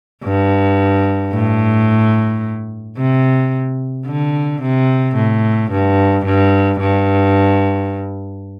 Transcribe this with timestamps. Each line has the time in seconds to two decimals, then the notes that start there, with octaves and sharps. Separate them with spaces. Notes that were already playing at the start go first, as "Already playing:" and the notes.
0.24 G2
1.33 A2
2.97 C3
4.07 D3
4.62 C3
5.16 A2
5.72 G2
6.26 G2
6.80 G2